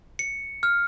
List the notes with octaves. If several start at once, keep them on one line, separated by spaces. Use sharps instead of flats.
C#7
F6